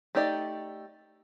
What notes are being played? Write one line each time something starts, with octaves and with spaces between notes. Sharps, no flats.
A3 D#4 G4 D5 D#5